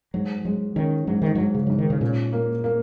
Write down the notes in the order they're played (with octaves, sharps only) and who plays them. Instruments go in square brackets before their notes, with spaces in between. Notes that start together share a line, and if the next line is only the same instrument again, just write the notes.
[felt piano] G#2 [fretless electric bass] F#3
[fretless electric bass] F#3 [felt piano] G#3
[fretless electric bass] D#3 [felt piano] C#4
[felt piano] G#2 [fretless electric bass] F#3
[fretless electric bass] D#3
[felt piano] G#2 [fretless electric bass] F#3
[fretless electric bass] C#3
[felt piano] G#2 [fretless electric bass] F#3
[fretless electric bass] D#3
C#3
[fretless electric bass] A#2 [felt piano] C#4
[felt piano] A#3
A#3